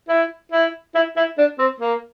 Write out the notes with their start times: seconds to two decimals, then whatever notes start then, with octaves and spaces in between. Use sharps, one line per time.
0.09 E4
0.52 E4
0.95 E4
1.17 E4
1.38 D4
1.59 C4
1.80 A#3